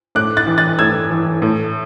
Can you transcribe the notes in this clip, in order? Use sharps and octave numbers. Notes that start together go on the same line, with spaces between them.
A2 D6 F#6
F#6 A6
E3
F#6 A6
A2 E6 G#6
E3
A2